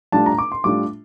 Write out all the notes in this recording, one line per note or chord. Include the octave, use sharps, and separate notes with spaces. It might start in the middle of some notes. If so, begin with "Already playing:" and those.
A2 G3 D4 F4 A5
A#5
D6
C6
A2 G3 D4 F4 D6